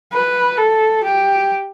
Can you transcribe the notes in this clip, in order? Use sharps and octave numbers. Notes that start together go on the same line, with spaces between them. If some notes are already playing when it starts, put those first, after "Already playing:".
B4
A4
G4